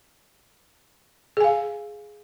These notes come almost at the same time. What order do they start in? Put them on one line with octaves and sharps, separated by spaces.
G#4 G#5 F5